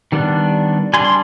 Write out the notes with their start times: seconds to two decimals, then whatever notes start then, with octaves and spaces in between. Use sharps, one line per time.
0.12 D#3 G3 B3 D4
0.94 G3 G#5 C6
0.98 D4
1.04 C6